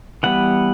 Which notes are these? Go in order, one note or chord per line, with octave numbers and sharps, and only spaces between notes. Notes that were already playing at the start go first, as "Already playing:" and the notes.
E3 G3 B3 F#5